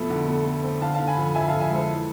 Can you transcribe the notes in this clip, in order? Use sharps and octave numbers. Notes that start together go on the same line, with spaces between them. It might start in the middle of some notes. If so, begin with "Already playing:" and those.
Already playing: F2 B2 A3 B5
D3
A3
A3
C4
D3 F5 A5
F5 A5
D3
G#5 B5
F2
F2 E5 G#5
F2 F5 A5
E5 G#5
G#3 A4 C5
E3